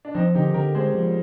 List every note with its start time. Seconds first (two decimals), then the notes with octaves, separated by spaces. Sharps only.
0.05 D4
0.15 F3 C4 D#4
0.34 D3 D#4 G4
0.54 D3 G4 A#4
0.75 G#3 G#4 C5
0.94 F3